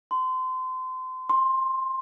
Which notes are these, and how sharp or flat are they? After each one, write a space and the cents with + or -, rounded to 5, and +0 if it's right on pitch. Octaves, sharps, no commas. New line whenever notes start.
C6 -30
C6 +15